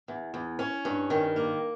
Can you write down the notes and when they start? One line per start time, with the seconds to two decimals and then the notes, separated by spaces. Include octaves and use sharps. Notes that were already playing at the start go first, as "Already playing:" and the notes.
0.08 E2
0.34 E2
0.59 C#4
0.85 G2
1.10 D#3
1.36 A#3